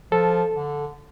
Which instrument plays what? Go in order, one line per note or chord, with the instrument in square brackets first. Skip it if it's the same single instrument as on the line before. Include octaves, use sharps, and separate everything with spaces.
[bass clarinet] F3 [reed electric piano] A4
[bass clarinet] D3